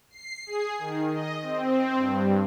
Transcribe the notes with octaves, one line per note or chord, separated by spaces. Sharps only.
C7
G#4
D#3
D#5
C4
G2